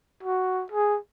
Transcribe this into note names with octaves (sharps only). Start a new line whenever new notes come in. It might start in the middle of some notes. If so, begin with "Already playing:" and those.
F#4
G#4